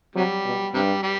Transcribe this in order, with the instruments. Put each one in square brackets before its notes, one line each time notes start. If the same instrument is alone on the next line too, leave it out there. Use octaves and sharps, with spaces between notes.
[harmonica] C3 G3 [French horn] F#3
[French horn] B2
[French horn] G2 [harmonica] C3 G3
[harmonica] G3